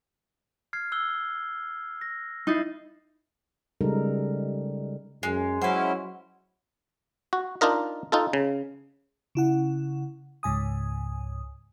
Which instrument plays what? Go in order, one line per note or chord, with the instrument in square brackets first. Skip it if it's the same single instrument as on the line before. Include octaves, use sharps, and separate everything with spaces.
[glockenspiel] F6 G#6 C7
E6 F#6 G7
A#6
[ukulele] D#4 E4 [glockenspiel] G6 A6 C7
[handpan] C#3 G3 G#3 D#4 A4 A#4
[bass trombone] F#2 [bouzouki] G#3
[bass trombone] F#3 [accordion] G#3 C#4 E4 [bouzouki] B4 C5 [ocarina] F#5
[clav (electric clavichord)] F#4
D4 D#4 F4 A#4 D#5
D#4 F4 A4
C#3
[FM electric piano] C#3 E4 F#5
C#2 G#2 G#5 D#6